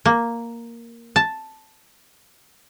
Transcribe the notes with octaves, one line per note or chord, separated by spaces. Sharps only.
A#3
A5